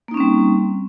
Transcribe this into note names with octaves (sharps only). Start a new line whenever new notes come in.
G3 A#3 C4 C#4 D#4